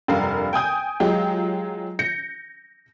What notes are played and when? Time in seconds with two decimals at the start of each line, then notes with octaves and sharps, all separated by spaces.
0.08 F1 G2 A#4 F5
0.53 G5 G#5 D#6 G6
1.00 F#3 G#3 F4 G4
1.99 G6 A#6 C#7